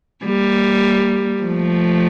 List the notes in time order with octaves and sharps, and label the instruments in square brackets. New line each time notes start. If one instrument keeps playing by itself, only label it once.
[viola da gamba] G3 A#3
F3 A3